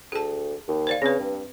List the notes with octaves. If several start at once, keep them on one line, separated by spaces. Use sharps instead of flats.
D2 G#4 A5
D#2
C5 D5 F5
C#3 C4 B4
G2